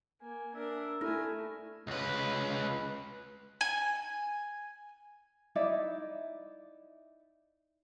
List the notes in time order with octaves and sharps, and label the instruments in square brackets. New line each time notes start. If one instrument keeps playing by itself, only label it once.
[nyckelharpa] A#3 [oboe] G#5
[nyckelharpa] D4 A#4 [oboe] E5
[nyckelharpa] A3 G#5 [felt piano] E4 [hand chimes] A4 F6 A#6
[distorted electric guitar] C#2 B4
[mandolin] G#5
[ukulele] D#4 E4 D5 E5